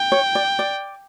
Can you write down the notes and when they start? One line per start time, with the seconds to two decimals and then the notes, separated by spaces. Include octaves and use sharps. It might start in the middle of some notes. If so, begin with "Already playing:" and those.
Already playing: G5
0.12 C#5
0.35 D5
0.59 D5